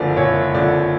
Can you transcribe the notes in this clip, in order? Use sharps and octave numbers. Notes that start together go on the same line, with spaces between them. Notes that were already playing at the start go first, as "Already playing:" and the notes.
Already playing: F#1 F2 D3 D5
F#1 C#5
F2 D3 D5